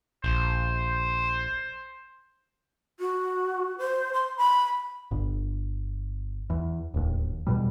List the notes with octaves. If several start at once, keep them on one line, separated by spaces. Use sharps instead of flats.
A#1 C5
F#4
C5
C6
B5
G1
E2
D1 D#2
E2 B2 G3